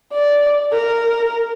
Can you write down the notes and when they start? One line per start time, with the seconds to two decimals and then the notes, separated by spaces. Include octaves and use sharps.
0.13 D5
0.72 A#4